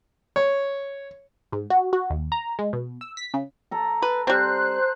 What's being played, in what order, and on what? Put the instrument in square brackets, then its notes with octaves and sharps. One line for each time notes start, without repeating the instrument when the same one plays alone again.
[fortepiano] C#5
[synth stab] G#2
F#4
F#4
D#2
A#5
G#3
B2
E6
B6
C#3
[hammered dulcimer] A4 A#5
[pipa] B4
[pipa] G3 C4 [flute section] C5 F#6